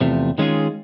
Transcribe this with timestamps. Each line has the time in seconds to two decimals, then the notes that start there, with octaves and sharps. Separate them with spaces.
0.01 E2 C3 F3 A3
0.38 D#3 G#3 C#4 F4 G#4